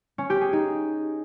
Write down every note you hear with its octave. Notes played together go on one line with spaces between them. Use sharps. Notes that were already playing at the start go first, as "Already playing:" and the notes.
C#4
G4
G#4
D#4